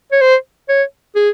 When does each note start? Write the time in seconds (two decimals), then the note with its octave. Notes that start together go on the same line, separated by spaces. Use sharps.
0.12 C#5
0.21 C5
0.69 C#5
1.15 G#4